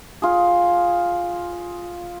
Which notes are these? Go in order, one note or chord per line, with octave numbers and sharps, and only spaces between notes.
F4 G#4